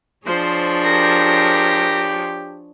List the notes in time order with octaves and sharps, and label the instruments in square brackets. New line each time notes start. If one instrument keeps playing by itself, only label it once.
[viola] F3 [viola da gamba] D4 G#4 C#5 [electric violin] C5
[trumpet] G4 [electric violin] A#4 A#6